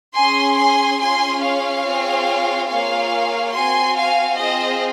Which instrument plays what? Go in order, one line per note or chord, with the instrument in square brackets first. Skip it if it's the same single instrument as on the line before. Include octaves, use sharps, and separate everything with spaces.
[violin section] C#4 G#4 G#5 C6
G#5 C6
C#4 F4 G#4 G#5 C6
C#5 F5
C4 F4 G#4
A#3 F4 G#4 C#5 F5
C4 F#4 G#5 C6
F5 G#5
C4 F4 G#4 C5 D#5